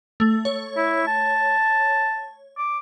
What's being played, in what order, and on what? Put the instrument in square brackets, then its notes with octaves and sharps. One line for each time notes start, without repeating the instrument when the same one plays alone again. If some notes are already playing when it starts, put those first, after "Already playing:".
[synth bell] A3
C#5
[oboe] E4
A5
D6